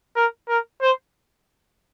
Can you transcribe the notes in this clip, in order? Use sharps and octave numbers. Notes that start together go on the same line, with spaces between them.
A#4
A#4
C5